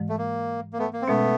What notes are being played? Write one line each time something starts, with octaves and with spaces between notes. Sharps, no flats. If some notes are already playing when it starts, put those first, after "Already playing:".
Already playing: G#2 E3 G#3
A3
A#3
A#3
A3 B3
A#3
C4
B2 G#3 A3 B3 C#4